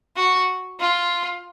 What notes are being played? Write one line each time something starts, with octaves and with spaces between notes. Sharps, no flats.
F#4
F4